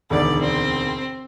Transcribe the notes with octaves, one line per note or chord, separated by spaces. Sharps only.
E1 D2 D#3 D5
C4